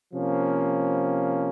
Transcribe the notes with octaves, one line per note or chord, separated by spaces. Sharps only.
C3 F3 A#3 C#4